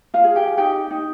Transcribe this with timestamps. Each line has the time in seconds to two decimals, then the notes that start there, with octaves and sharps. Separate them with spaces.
0.14 F4 F5
0.24 G#4
0.36 G4 G5
0.57 D#4 G4 G5
0.91 D#4